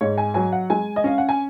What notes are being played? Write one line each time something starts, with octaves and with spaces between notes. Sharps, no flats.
G#2 C#5
G#5
F#3 G#5
F#5
G#3 G#5
D#5
C#4 F5
F#5
G#5